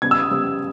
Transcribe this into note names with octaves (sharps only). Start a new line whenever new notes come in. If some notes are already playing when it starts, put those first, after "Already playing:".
C#3 G3 B3 G#6
E6
D#6
C#3 G3 B3